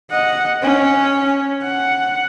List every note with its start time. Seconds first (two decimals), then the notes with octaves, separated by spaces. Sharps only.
0.11 D#5 F#5
0.62 C#4
1.62 F#5